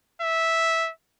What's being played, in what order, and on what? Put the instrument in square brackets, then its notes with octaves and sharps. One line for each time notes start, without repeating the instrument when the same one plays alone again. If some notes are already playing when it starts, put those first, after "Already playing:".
[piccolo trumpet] E5